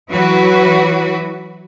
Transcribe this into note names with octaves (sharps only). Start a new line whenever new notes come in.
E3 F#3 E4 F#4 B4